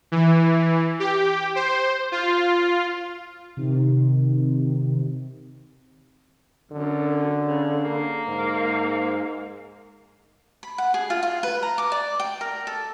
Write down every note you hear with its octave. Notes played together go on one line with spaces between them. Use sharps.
E3
G4
C5
F4
C3 D#3
F#2 D3
C#3
A#3
G#2
B5
F#5
G#4
F4
F4
B4
A#5
D6
D5
G5
A#4
A4